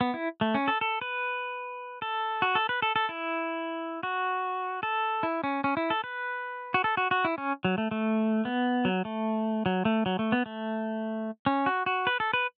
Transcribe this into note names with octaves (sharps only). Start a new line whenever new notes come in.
B3
E4
A3
C#4
A4
A4
B4
A4
F#4
A4
B4
A4
A4
E4
F#4
A4
E4
C#4
C#4
E4
A4
B4
F#4
A4
F#4
F#4
E4
C#4
F#3
A3
A3
B3
F#3
A3
F#3
A3
F#3
A3
B3
A3
C#4
F#4
F#4
B4
A4
B4